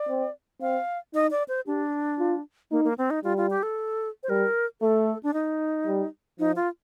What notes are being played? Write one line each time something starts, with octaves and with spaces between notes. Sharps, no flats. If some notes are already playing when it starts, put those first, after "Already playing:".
Already playing: D5
C4
C4 F5
D#4 D#5
D5
C5
D4 G4
F4
A#3 D#4
A#3
C4
D#4
G3 F4
F4
G4
A4
C5
G3 A#4
A3 A4
D4
D#4
G3
F3 D#4
F4